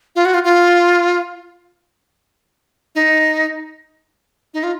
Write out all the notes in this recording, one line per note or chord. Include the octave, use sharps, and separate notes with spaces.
F4
F#4
F4
F4
D#4
D#4
F4